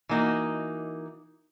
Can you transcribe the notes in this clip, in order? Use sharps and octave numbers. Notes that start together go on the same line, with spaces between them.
E3 A#3 D#4 F#4